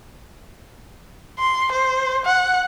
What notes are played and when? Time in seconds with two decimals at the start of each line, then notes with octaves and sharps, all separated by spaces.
1.39 C6
1.72 C5
2.25 F#5